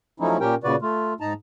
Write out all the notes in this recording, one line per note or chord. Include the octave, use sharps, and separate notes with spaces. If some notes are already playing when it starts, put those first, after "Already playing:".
F3 F#3 A3 C#4 D#4 E4
A#2 C#4 G4 A#4 G5
A#2 C#3 F#4 B4 D5
A3 F4
G#2 D#4 A5 A#5